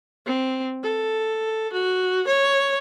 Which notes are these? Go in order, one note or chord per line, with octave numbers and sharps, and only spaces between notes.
C4
A4
F#4
C#5